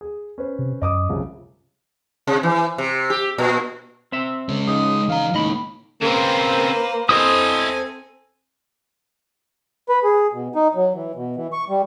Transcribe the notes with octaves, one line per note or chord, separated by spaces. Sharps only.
G#4
C#4 B4 C5
C3
F#2 D#5 D6 D#6
C2 C#3 F3
C3
E3
C3
G4
A#2
C4 E5
C#3 G#3 C#4
C#3 D#4 D#6
E3 F5 A#5
C#2 A2 A#3 D#4 D#5 B5
C#3 A#3 C4 B4 C5
C4 E4 A4 C5 D#5 G#5 D#6
B4
G#4
B2
D#4
F#3
E3
B2
E3
C#6
G3